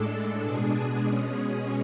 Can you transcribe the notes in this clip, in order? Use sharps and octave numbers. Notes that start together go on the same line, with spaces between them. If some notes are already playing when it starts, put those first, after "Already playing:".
Already playing: A2 G#3 D4 A4
B2 G#3 D4 G#4
B2 G#3 C#4 G#4